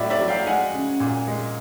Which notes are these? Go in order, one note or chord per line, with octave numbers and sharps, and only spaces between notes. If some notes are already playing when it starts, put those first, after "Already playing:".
Already playing: A2 F#3 D5 E5
D5 E5
F#3
F5 G5
G#3 F#5 G#5
C#3
A#2
G#3